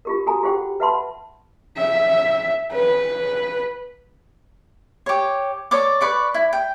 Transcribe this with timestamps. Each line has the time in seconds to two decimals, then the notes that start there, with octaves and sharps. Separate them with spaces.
0.05 F4 G4 A#4
0.26 F#4 A4 G#5 A#5
0.43 F4 G4 G#4 C5 F#5 G5
0.80 B4 E5 F#5 A5 B5 C6
1.77 E5
2.72 B4
5.06 G4 C#5
5.71 A4 C#5 D5 D6
6.01 B4 D5 C#6
6.34 E4
6.53 G5